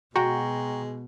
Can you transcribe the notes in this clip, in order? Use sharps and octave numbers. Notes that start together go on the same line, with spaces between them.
B2 G#3 F#4 G5 A#5 C#6